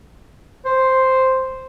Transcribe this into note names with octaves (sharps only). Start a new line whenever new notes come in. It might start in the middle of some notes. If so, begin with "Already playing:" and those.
C5